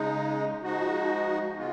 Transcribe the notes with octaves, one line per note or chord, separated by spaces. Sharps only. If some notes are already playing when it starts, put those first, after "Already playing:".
Already playing: C#3 G#3 D#4
F3 G#3 D#4 F#4
C#3 G#3 B3 F4